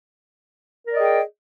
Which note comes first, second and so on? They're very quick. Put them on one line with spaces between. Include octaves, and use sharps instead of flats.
A#4 D5 D#5 G#4 G5